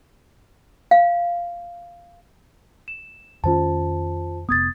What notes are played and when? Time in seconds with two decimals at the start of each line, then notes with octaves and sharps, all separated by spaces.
0.91 F5
2.88 E7
3.44 F2 D#3 C#4 F4 C5 A5
4.49 F1 D#2 B3 D#6 G#6 A6